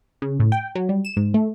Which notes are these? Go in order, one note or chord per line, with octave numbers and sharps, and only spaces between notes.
C#3
A2
G5
F#3
G3
E7
G#2
A3